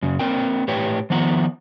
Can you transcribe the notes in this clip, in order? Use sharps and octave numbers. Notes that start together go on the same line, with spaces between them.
F#2 C#3
A#3 C4 A#4 G5
A2 G4 B4 C#5 G5
D#3 F3 B3 F#5 A#5